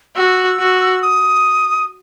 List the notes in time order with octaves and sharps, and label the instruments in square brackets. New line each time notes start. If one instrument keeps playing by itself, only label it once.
[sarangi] F#4 [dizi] E6
[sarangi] F#4
[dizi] D#6